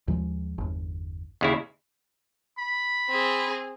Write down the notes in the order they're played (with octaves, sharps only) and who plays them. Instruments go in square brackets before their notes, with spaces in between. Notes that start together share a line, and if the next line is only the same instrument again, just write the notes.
[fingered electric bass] D#2 F3 G#3
G1 E2
[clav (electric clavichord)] D#2 C#3 E4
[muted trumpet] B5
[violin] C4 G#4